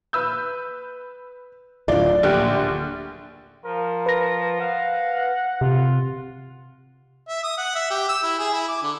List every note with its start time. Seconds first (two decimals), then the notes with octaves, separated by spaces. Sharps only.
0.13 B4 E6 G6
1.88 D1 G#1 D4 F4 D5
2.23 A#1 D3 G4 F#6
3.65 F3 A#4
4.06 B4 A#6
4.61 F5 F#5
5.61 C3 F4
7.28 E5
7.44 D#6
7.58 F#5
7.75 E5
7.91 G4
8.09 E6
8.23 E4
8.39 G#4
8.53 E4
8.69 D6
8.83 D3